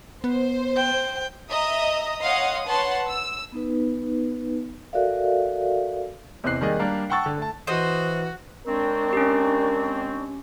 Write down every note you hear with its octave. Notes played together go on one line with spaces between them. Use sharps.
B3 C5
G5
D#5 E5 A#5 D#6
C#5 D#5 F5 F#5 C6 D#6
B4 C#5 F#5 A5 C6
E6
B3 D#4 B4
F#4 A4 A#4 D5 E5 F5
E2 C3 C4 D#5 F#6 C7
D#3 G3 A#3 G#4 D5 D#5
G3 A#3 D4 A#4 F5
F#5 G5 A5 C#6 E6 A6
D3
A3 A5
E3 F#4 C5 D#5
D#2 G#3 C4 D4 A#4 C#6
C#4 G4